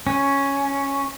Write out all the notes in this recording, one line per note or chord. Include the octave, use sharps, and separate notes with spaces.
C#4